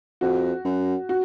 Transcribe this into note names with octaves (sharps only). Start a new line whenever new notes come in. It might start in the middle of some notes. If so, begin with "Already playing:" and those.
F2 F#4
F#2
F#4